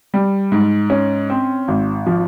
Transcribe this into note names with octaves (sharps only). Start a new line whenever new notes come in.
G3
G#2
C#4
C4
G#1
F3